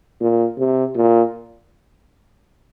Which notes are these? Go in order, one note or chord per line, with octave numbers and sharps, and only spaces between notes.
A#2
C3
A#2